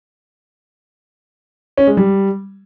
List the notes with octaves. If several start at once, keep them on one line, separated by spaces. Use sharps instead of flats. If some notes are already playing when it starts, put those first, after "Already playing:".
C#4
G#3
G3